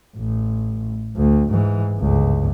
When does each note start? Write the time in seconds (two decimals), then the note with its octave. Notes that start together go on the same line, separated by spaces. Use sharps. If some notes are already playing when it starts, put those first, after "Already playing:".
0.16 A1
1.16 D2
1.49 G#2 E3
1.97 G1 C#2